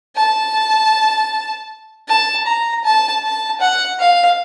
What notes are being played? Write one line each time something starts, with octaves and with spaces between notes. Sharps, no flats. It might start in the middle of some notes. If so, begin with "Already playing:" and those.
A5
A5
A#5
A5
A5
F#5
F5